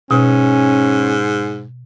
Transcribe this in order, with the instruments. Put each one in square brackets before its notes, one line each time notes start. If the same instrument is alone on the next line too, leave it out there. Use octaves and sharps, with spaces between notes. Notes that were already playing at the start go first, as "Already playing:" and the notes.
[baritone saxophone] G#2 [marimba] B2 [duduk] C#4